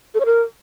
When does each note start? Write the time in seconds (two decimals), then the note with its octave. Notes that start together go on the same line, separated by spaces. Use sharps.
0.15 A4
0.20 C#5
0.26 A#4